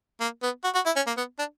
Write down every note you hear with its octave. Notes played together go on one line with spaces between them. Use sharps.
A#3
B3
F#4
F#4
E4
C#4
A#3
B3
D4